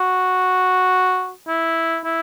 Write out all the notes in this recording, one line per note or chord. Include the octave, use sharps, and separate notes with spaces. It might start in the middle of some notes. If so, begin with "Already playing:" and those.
Already playing: F#4
E4
E4